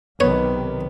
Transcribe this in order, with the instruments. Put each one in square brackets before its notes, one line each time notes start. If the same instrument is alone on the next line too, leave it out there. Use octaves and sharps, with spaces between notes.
[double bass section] B1 C3 D#3 [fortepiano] B3 [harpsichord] C#5